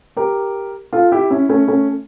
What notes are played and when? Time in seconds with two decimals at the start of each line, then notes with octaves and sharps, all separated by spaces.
0.17 G4 A#4
0.93 F4 A4
1.12 E4 G4
1.30 C#4 E4
1.49 A3 C#4
1.68 A3 C#4